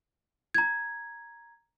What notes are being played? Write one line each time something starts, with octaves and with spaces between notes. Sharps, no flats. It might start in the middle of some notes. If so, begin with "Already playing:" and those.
A#5 G#6